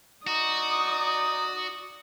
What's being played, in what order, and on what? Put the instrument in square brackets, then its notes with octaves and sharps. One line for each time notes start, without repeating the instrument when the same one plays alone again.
[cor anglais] D#4 [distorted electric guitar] F#4 [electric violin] D5 D#6